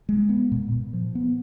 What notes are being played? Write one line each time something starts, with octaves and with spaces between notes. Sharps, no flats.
G#3
B3
A#2
A#2
F3
B3